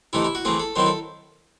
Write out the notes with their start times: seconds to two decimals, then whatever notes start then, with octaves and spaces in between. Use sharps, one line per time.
0.13 C3 E3 A3 D#4 E4
0.25 E4
0.35 F#4
0.45 E3 A3 C4 G#4
0.60 A4
0.76 D#3 F#3 C4 E4 C5
0.86 A4